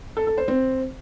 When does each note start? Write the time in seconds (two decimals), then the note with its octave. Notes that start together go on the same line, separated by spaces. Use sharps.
0.17 A4
0.27 A4
0.38 C5
0.48 C4